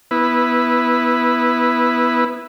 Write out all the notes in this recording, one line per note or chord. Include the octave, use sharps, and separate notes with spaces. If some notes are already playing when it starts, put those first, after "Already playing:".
B3 E4 B4